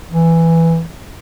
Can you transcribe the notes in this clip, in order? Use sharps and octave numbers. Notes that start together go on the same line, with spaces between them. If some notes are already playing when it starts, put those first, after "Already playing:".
E3